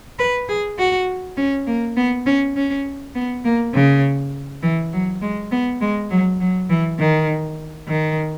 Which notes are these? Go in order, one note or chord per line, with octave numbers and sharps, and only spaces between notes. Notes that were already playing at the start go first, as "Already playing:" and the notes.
B4
G#4
F#4
C#4
A#3
B3
C#4
C#4
B3
A#3
C#3
E3
F#3
G#3
B3
G#3
F#3
F#3
E3
D#3
D#3